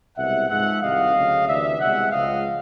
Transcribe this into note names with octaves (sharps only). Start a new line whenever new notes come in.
C2 B2 G#3 E5 F#5
G#2 F3 G#3 E5 F#5
C2 C3 D#3 D#5 F5
D2 C#3 F#3
D2 C3 E3 D5 E5
C2 B2 G#3 E5 F#5
C#2 C#3 F3 G#3 D#5 F5